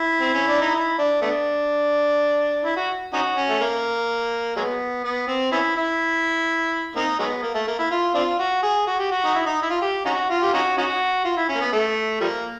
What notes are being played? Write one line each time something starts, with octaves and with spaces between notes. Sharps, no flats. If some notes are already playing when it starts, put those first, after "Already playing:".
Already playing: E4
C4
C#4
D4
D#4
E4
D4
A3 B3 D4
E4
F#4
C#4 D#4 F#4
C#4
A3
A#3
F#3 G#3 B3
B3
C4
B3 C#4 E4
E4
A#3 C4 D#4
F#3 G#3 B3
A#3
A3
A#3
E4
F4
C4 D4 F4
F#4
G#4
F#4
G4
F#4
D#4
E4
D#4
E4
F4
G4
C#4 D#4 F#4
F4
G4
C#4 D#4 F#4
C#4 D#4 F#4
F4
E4
C#4
A#3
B3
A3
F3 G3 A#3